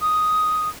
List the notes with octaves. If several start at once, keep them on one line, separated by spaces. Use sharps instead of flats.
D#6